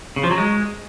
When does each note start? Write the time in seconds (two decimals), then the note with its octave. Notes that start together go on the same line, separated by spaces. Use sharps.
0.16 C#3
0.24 F3
0.31 F#3
0.38 G#3